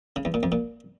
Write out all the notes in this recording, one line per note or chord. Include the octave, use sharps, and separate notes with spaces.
C#3
E2
A#2
F2
A#2